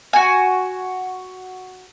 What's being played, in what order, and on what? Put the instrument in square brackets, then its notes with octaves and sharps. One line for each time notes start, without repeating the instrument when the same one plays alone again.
[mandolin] F#4 G#5